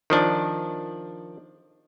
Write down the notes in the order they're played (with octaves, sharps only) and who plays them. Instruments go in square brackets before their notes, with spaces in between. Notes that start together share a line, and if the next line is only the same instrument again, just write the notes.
[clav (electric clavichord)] D#3 F3 D4